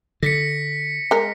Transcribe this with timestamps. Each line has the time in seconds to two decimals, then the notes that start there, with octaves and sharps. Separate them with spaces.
0.23 D3 A#6 B6 C#7
1.11 G#3 A#4